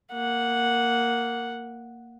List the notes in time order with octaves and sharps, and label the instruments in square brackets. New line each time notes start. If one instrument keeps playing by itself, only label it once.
[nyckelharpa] A#3 F#5